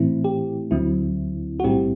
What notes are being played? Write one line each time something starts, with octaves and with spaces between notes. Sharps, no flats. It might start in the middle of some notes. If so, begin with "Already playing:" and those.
Already playing: A2 E3 A3 C4 E4
G4
D2 D3 F#3 C4 E4
F#4
B1 A2 G3 C4 E4 G4